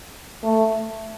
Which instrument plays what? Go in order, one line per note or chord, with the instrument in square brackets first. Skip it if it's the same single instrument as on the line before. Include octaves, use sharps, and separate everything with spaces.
[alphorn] A3